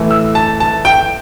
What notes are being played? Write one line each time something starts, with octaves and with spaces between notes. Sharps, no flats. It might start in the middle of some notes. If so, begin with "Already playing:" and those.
Already playing: A2 E3 A3
E6
A5
A5
G5